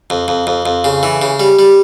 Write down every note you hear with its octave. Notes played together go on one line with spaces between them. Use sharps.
F2
F2
F2
F2
C#3
E3
C#3
G3
G3